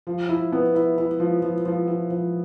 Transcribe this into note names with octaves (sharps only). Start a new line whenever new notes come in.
F3
E4
B3
E4
E4
F3
F3
F3
E4
F3